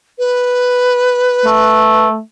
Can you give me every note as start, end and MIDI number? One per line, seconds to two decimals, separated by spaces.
0.19 2.08 71
1.45 2.20 57